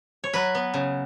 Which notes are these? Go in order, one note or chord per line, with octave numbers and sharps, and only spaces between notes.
C#5
F#3 B4
B3
C#3